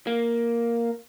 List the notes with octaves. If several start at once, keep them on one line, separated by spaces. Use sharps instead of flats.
A#3